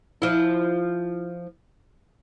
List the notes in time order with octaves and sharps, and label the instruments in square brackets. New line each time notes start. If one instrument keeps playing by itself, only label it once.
[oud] F3 E4